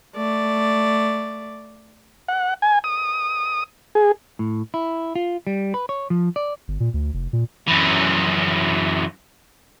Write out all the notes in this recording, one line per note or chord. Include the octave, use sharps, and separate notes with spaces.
A3 D5
F#5
G#5
D#6
G#4
A2
E4
F4
G3
B4
C#5
F3
D5
G1
A#2
D2
F1
A#2
F#2 E3